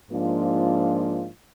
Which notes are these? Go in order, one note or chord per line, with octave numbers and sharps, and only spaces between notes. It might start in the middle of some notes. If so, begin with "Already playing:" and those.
G#2 F3 A#3 D4 F4